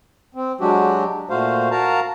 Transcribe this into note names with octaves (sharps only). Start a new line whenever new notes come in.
C4
F#3 G#3 D4 F#4 G4
A#2 A3 F#4 C5 F5
F#4 A#4 F5 A5 A#5